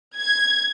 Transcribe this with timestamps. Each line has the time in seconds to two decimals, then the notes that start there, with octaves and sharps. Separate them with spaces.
0.17 G#6